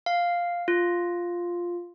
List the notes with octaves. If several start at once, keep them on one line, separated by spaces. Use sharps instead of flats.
F5
F4